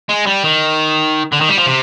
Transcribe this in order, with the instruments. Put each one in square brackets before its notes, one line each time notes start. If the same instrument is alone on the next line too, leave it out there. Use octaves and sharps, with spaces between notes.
[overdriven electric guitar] G#3
G3
D#3
D3
D#3
G3
F3
C3